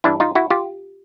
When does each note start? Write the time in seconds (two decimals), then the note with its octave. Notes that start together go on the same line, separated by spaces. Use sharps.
0.04 G2 E3 D4 E4
0.20 D#4 F4
0.35 E4 F#4
0.50 F4 G4